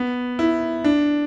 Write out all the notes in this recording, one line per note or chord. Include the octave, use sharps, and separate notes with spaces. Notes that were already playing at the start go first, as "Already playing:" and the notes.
Already playing: B3
E4
D4